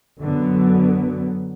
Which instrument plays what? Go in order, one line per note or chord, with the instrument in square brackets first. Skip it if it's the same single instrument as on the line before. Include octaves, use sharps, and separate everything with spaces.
[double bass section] F#2 D3 F#3 B3